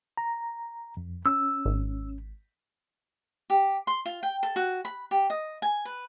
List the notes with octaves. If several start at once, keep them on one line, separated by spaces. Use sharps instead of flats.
A#5
F2
C#4 E6
G#1
G4
C6
F4
G5
A4
F#4
B5
G4
D#5
G#5
B4